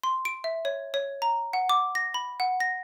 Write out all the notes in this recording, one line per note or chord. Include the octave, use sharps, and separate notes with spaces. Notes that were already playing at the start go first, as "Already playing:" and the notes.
C6
D7
E5
C#5
C#5
A#5
F#5
D6
A#6
B5
F#5
A#6